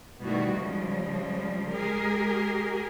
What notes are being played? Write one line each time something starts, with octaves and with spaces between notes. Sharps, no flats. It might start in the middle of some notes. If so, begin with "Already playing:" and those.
B2 D#3 E3 G3 A3 F#4
C#3 F3 G3 G#3
G#3 G4 G#4 A#4